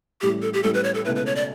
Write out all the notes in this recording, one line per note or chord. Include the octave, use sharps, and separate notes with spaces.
A1 A2 G3 G4
A4
G4
A1 A2 G3 A4
B4
C#5
A4
C#2 B2 A3 E4 B4
B4
C#5
D5